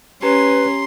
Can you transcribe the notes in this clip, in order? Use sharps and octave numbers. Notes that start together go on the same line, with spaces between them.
C#4 G4 B4 A#5 C6